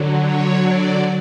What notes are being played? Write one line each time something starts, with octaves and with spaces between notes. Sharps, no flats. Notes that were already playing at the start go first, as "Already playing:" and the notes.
Already playing: D3 F#3
C#5
D5